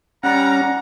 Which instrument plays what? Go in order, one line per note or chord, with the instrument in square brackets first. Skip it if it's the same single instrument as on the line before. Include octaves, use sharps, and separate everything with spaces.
[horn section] G3 F#5 A#5 [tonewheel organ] C#4